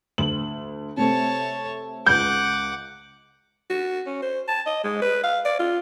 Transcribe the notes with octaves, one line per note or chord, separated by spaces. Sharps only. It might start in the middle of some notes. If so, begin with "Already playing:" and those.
D2 F#7
C3 A3 C4 C#5 A5
C#2 F#5 D6 G6
F#4
C#4
C5
A5
D#5
G#3
B4
F5
D5
F4